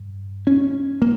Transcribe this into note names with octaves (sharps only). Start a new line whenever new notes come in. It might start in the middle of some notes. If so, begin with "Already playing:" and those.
Already playing: G2
C#4
A#3